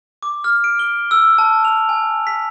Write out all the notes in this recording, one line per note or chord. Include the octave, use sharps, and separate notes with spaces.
D6
F6
D7
G7
E6
A5
F7
G#5
B6